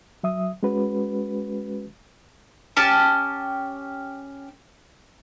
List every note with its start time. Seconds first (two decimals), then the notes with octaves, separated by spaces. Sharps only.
0.23 F#3 E5 D#6
0.63 G#3 C#4 F#4 B4
2.77 C#4 G4 A5